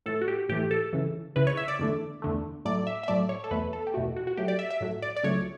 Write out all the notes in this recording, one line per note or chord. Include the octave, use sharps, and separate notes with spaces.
A2 E3 A3 A4
F#4
G4
A2 E3 A3 G4
A4
C#2 C#3 E3
C#2 C#3 E3 B4
C#5
E5
D5
E2 D3 A3
E2 D3 A3
A2 F#3 A3 D5
E5
E5
A2 F#3 A3 D5
C#5
A4
E2 B2 A3 B4
A4
G4
E2 B2 A3 F#4
F#4
F#4
A2 F#3 A3 G4
D5
E5
E5
A2 F#3 A3
D5
D5
C#2 C#3 F#3 A3 C#5